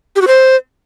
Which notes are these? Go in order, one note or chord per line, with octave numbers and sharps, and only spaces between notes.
G4
F#4
C5